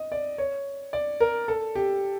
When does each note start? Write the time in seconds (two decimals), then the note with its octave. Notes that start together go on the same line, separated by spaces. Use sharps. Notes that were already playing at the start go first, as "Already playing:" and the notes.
Already playing: D#5
0.12 D5
0.38 C#5
0.93 D5
1.20 A#4
1.48 A4
1.75 G4